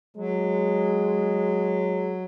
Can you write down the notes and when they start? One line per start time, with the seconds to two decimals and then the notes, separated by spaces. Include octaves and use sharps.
0.16 F#3 G#3